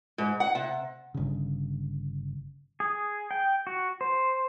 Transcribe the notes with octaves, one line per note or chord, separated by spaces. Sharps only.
G#2
F#5
C3
G1 C#3
G#4
G5
F#4
C5